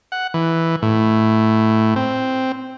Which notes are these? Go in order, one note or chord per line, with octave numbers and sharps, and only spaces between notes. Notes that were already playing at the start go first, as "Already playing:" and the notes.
F#5
E3
A2
C4